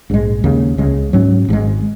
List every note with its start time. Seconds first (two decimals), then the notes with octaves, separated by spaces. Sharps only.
0.10 A#1 G#2 G#3
0.44 D#2 C#3 A#3
0.78 C#2 C#3 G#3
1.13 G#2 F#3 C#4
1.49 G#1 G#2 G#3